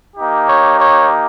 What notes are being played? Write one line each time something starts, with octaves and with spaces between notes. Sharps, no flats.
A#3 D#4 G4
C#5
C#5